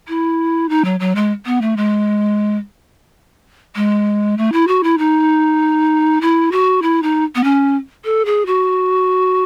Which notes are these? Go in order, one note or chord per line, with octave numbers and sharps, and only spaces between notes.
E4
D#4
F#3
F#3
G#3
B3
A3
G#3
G#3
A3
E4
F#4
E4
D#4
E4
F#4
E4
D#4
B3
C#4
A4
G#4
F#4